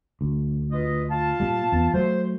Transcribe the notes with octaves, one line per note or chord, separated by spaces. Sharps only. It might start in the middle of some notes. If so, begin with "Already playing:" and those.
D2
F4 B4 D#5
F4 F5 A5
A#2 G3
E2 B3
F#3 A3 C5